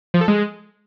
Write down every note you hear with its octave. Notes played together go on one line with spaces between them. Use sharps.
F3
A4
G#3